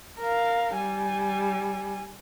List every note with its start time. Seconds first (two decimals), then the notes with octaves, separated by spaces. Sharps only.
0.20 A#4 F5
0.76 G3 G#5